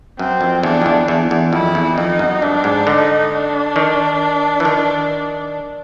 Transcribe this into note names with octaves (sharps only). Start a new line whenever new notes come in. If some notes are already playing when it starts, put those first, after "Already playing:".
F#2 C4
F2
E2 D4
F2
E2
E2
E2
F2 E4
E2
F2 D#4
F#2
G2 D4
G#2
D3 D#4
D4
D#3
E3
D#3